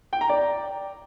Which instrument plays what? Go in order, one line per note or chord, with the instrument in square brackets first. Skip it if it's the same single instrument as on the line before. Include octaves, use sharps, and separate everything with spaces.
[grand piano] G5
A#5
D5